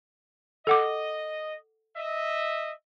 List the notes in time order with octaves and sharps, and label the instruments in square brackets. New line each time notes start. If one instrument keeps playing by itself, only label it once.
[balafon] A4 F#5 D6 [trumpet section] D#5
[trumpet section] D#5 E5